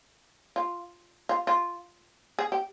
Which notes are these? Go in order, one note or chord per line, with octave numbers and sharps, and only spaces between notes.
F4
F4
F4
G#4
G4